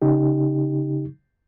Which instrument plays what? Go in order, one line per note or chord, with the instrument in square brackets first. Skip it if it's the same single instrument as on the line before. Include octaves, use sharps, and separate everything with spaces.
[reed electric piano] C#3 D#4 G4